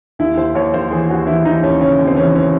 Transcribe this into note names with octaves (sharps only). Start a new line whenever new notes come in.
D#2 E4
D#2 C5
D#2 C#5
D#2 C5
E3 G#4
D#2 F#4
E3 E4
E3 D#4
D#2 C#4
C#3 C#4
D#2
C4
E3 C#4
C#4